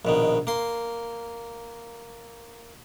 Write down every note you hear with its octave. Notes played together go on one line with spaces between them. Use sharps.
A#1 B2 D#3
A#3 C6